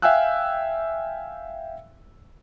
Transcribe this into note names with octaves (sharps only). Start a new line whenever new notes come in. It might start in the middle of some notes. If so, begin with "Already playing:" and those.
E5 F5 G5 G#5 E6 F#6